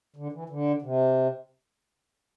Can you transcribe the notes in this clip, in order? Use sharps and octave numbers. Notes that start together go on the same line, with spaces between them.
D3
E3
D3
C3